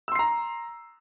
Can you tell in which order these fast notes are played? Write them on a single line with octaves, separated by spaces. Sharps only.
E6 C6 C7 A#5